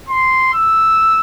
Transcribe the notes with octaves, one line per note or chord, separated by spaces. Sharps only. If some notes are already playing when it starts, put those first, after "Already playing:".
C6
E6